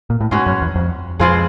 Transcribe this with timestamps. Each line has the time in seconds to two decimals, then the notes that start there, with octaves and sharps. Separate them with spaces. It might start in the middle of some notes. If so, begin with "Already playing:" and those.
0.10 A#2
0.21 A2
0.31 G#2 B2 G#3 C#4 F#4
0.46 F#2
0.62 E2
0.76 F2
1.20 F2 B2 G#3 C4 F4 G#4